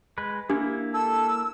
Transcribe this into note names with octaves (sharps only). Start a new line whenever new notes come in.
G#3 B4
A#3 D4 E4 G4
A4 E6